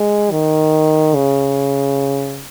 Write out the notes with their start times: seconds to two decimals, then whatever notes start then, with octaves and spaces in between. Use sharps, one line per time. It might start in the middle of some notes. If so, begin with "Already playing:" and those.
Already playing: G#3
0.31 D#3
1.15 C#3